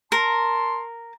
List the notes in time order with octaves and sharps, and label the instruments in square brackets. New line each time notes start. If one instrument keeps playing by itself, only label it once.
[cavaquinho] A#4 [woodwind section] A5 C6